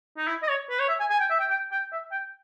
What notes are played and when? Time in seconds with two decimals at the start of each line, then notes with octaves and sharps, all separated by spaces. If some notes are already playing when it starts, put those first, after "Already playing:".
0.17 D#4
0.28 E4
0.43 D#5
0.49 C#5
0.70 B4
0.80 C#5
0.89 E5
1.00 G#5
1.10 G#5
1.20 G5
1.30 E5
1.40 G5
1.50 G5
1.72 G5
1.92 E5
2.11 G5